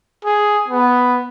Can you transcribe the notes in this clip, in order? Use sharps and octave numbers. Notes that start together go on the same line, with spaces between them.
G#4
B3